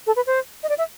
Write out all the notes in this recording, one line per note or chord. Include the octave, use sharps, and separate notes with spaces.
A4
B4
C5
D#5
D5
E5